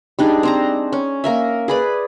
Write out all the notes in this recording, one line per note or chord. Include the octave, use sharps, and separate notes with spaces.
G3 D4 D#4 G#4
C4 C5 A#5
C#4
A#3 A#4 E5
G#4 B4 D5